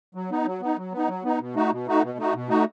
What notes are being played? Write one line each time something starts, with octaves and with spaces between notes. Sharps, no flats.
F#3
B3 D#4
F#3
B3 D#4
F#3
B3 D#4
F#3
B3 D#4
B2
A3 D#4 F#4
B2
A3 D#4 F#4
B2
A3 D#4 F#4
B2
A3 D#4 F#4